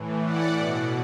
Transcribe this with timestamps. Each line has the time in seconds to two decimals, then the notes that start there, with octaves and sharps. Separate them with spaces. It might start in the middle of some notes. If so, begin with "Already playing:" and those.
Already playing: A2 E3
0.25 D5 F#5
0.58 B2